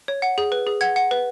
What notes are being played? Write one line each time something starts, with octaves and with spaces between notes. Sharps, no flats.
C#5
F#5
G#4
B4
G#4
F#5 G#6
F#5
B4